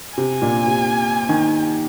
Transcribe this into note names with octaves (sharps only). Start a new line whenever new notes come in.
C3 G#5
A#2
C3
D#3